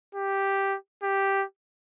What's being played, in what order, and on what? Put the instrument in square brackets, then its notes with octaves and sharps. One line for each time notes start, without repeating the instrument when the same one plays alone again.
[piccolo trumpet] G4
G4